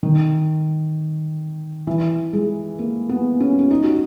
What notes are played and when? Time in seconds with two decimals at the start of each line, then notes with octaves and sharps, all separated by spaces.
0.03 D#3
1.87 E3
2.33 G#3
2.79 A#3
3.09 B3
3.40 C#4
3.59 C#4
3.71 D#4
3.83 F#4